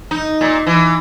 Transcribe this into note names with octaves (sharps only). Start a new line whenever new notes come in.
D#4
A#2
E3